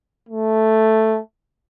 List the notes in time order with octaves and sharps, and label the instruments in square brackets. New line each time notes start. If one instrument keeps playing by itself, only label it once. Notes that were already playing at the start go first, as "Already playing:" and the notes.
[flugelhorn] A3